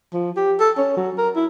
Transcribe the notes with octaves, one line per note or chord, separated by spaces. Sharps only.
F3
G4
A4
C#4
F#3
A#4
E4